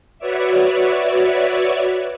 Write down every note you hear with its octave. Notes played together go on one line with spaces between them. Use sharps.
F#4 B4 C#5 D5 E5